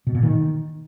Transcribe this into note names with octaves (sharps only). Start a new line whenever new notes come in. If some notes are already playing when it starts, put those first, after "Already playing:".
B2
A#2
D#3